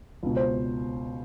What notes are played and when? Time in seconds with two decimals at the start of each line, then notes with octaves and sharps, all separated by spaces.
0.23 C#2 B2
0.36 C5